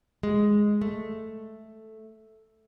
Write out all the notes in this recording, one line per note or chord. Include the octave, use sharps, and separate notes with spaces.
G#3
A3